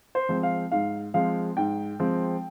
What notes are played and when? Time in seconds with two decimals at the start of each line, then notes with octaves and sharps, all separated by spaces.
0.15 C5
0.29 F3 G#3 C4
0.43 F5
0.72 G#2 F5
1.14 F3 G#3 C4 F5
1.57 G#2 G5
2.00 F3 G#3 C4